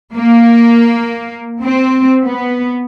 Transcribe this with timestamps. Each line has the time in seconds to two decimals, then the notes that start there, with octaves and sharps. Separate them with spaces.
0.14 A#3
1.63 C4
2.24 B3